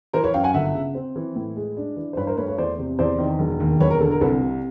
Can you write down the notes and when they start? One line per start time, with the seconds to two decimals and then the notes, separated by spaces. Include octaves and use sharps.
0.13 E3 A#4 C5
0.24 B4 C#5
0.34 F#2 F5 G5
0.44 F#5 G#5
0.54 G1 E5 F#5
0.74 C#3
0.95 C4
1.16 E3
1.35 A2
1.56 G#3
1.77 D4
1.96 E3
2.13 C5
2.17 G2 B4 C#5
2.27 A#4 C5
2.37 A3 B4 C#5
2.48 B4 C#5
2.58 E2 C5 D5
2.78 C3
2.99 E2 C5 D5
3.19 D#3
3.39 E1
3.60 D#2
3.80 E1 B4 C#5
3.91 A#4
4.01 D3 A4
4.11 A#4
4.21 C2 A4 B4
4.42 C3